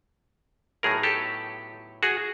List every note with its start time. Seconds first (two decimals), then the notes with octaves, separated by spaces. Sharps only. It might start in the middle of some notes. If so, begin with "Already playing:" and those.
0.83 A2 F#3 B3 D#4 G#4 A#4
1.03 G4 A4
2.03 F#4 G#4